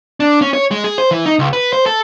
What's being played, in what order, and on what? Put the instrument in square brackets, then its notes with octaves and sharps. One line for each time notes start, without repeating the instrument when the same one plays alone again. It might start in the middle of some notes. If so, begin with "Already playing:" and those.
[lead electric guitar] D4
C#4
C#5
G#3
G#4
C5
E3
D#4
C#2
B4
C5
A4